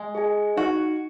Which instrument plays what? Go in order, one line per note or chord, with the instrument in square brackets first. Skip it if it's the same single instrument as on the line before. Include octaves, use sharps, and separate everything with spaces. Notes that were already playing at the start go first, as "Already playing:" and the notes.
Already playing: [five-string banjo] G#3
[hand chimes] G#4 D#5 G#5
[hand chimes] D#4 [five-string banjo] F#4